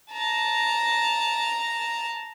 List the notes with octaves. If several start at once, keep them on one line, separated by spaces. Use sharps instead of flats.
A5 A#5